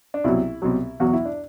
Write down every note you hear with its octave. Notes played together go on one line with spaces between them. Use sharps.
D4
C2 B2 F#3 E4
C2 B2 F#3
E2 B2 F#3 F#4
E4
D4